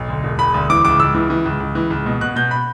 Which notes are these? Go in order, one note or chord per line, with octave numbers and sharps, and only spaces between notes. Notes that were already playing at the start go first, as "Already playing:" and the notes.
Already playing: B1
D2
E1
E1 B5
D2
E3 D6
C#2 D6
C#2 E6
E3
E3
C#2
C#2
E3
C#2
B2
B2 F#6
B2 G6
B5